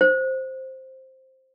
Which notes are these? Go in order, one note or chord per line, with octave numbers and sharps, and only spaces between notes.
C5